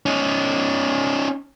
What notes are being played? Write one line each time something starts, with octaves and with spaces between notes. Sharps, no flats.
C#4 D#4